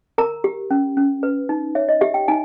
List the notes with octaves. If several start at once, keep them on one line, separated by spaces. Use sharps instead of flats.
A#4 A#5
G4
C#4
C#4
B4
D#4
C#5 E5
D#5
G4 E5
G5
D#4 G#5